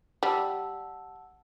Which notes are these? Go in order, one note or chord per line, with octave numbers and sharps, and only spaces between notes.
G3 F#5 A5 E6